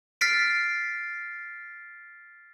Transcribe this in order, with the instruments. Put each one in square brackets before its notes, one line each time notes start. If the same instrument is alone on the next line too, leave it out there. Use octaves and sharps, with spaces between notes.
[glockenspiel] F6 A6 B6 C7 D7